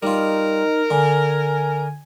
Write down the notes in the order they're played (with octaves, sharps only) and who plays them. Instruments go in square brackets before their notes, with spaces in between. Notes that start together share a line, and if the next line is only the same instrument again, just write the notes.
[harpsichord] G3 F4 [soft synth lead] D#4 [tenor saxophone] A#4
[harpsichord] D3 [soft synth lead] G#5